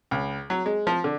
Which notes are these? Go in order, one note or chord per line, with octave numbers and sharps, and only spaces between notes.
C#2
F#3
G#3
F3
D3